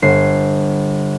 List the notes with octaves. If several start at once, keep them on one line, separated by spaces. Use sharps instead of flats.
G1 C7